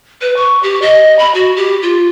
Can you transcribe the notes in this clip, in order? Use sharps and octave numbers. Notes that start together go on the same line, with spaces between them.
B4
C#6
G4
D#5
B5
F#4
G4
F4